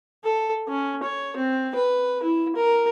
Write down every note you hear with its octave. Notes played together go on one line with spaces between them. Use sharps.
A4
C#4
C#5
C4
B4
E4
A#4